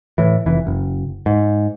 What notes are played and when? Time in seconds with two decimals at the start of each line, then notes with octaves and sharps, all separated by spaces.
0.18 A2 E3
0.46 F1 E3
0.67 F#1
1.26 G#2